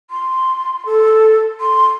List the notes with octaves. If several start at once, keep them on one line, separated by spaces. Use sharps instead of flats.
C6
A4
C6